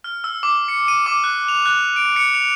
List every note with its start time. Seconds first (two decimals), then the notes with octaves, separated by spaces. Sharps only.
0.04 F6
0.24 E6
0.43 D6
0.68 C#7
0.88 D#7
1.06 D6
1.24 F#6
1.48 F7
1.66 F#6
1.96 D7
2.16 C#7
2.35 F7